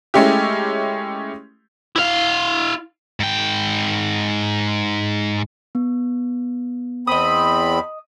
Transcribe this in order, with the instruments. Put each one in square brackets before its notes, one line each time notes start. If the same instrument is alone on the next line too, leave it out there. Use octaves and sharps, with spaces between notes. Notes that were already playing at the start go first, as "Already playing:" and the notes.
[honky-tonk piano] G#3 A3 C#4 E4 G4
[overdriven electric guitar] E4 F5
[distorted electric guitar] G#2 G5
[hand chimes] B3
[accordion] E2 C4 B5 [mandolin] D#5 D#6